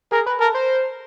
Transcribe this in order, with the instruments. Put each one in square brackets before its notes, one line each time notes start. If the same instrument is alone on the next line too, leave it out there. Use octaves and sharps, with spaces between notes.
[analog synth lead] G#4 [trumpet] A#4
[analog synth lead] B4
[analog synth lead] A4 [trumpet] A#4
[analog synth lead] C5